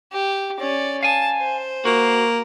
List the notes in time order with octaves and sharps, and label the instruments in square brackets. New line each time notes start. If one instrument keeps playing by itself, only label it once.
[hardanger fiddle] G4
C#4 D5
[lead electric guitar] F5 G#5 [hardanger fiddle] A5
[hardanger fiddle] C5
[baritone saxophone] A#3 [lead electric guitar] F#4